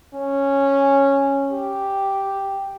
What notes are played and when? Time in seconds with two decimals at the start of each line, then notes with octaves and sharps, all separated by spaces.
0.14 C#4
1.51 G4